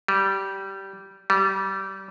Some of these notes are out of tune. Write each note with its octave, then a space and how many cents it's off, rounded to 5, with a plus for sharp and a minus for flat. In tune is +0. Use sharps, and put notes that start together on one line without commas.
G3 -15
G3 -25